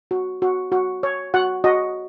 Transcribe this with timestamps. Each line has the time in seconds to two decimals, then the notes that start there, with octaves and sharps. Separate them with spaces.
0.11 F#4
0.42 F#4
0.72 F#4
1.03 C#5
1.34 F#4 F#5
1.64 F#4 D#5